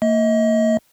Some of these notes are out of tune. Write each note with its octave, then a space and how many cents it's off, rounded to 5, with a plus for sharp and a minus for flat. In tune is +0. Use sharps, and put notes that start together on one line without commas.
A#3 -35 D#5 +35